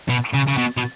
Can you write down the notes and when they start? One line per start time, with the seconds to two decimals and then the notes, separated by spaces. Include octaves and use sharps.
0.09 B2
0.33 C#3
0.47 C#3
0.57 B2
0.77 B2